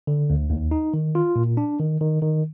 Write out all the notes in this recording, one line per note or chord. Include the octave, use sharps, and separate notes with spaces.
D3
D2
D#2
D#4
D#3
F4
A#2
D4
D#3
D#3
D#3